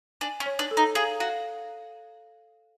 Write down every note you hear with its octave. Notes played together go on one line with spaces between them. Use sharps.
D4 G#5
C#4
C#5
D4
A4
D#4
G#4 F5
F#4 F5